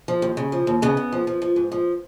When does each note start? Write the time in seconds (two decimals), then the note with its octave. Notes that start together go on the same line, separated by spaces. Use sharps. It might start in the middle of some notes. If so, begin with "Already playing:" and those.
0.08 F3
0.22 D#2
0.37 C#3
0.52 F3
0.67 D#2
0.82 C#3 B3
0.97 C#3
1.12 F3
1.27 F3
1.42 F3
1.56 G#2
1.72 F3